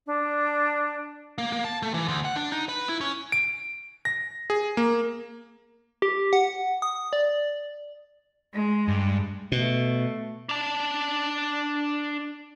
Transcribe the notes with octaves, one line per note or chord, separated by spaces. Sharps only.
D4
A#3
A#3
A5
A3
E3
D2
F#5
D4
D#4
B4
E4
C#4
D7
A#6
G#4
A#3
G4
F#5
D#6
D5
G#3
G2
B2 A3
D4 A5